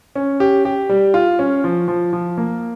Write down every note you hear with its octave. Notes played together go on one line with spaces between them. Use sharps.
C#4
G4
G4
G3
F4
C#4
F3
F3
F3
A#3